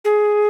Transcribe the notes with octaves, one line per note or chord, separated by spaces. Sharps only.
G#4